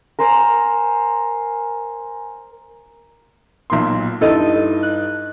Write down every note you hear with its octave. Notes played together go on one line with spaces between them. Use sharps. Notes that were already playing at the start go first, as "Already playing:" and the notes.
A#4 C5 G#5 A#5
B1 A#2 C6
G2 D#4 E4 A4 D#5
F#6